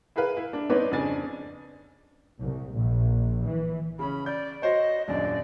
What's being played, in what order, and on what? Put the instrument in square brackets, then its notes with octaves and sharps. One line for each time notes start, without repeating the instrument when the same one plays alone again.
[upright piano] E4 G#4 A#4 B4 F5
E4
D4
B3 C4 D#4 B4 C#5 D5
F2 C#3 D4 G#5 A6
[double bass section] C2
A#1
E3
[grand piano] C#3 C#4 [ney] B5
[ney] D5 [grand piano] G6
[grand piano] F#4 C5 C#5 [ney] D#5
[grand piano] D#1 F#2 D4 [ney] D5